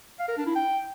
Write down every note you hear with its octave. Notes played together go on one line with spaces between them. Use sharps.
F5
A#4
D4
E4
G5